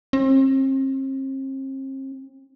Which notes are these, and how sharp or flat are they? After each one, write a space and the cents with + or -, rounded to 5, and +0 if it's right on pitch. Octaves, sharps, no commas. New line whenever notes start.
C4 +40